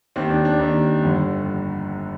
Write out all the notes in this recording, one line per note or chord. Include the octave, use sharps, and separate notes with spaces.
D#2 D#3 C4
D4
D4
D#2 D#3
G1 F2 D3